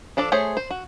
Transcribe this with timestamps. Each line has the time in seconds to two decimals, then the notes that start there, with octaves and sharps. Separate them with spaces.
0.17 F3 D4 A4 D5
0.32 A3 G#4 C5 C#5
0.57 C5
0.70 F#4